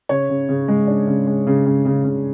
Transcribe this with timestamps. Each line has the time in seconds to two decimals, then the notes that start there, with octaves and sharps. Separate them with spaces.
0.09 C#3 C#5
0.29 C#3
0.49 C#3
0.68 G#3
0.87 D4
1.07 C#3
1.27 G#3
1.47 C#3
1.66 C#3
1.85 C#3
2.05 C#3